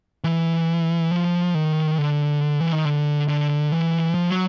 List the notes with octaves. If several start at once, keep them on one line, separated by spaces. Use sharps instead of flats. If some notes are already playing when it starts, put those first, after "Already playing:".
E3
F3
D#3
D3
E3
D#3
D3
D3
E3
F3
F#3